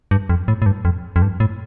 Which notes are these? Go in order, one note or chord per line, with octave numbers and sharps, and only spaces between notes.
G2
F2
A2
A2
G2
F2
F2
G2
A2